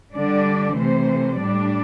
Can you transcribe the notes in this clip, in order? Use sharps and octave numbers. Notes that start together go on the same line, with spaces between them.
D3 G3 D4 D5
C3 E3 A3 C5
A2 G3 D4 D5